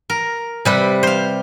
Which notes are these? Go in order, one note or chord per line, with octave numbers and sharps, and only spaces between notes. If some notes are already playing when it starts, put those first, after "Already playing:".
A#4
C3 G3 B4
C5 F5